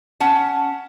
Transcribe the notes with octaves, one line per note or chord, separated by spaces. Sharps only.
C#4 F#5 A5